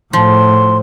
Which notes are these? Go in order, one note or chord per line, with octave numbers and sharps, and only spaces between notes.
A2 F3 C6